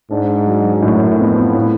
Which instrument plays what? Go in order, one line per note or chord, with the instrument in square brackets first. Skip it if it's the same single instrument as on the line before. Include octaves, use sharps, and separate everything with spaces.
[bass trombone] G#2 [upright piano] D4
[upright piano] F#3
[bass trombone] F#2 [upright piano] A2
[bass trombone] F2 [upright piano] B3
[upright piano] A2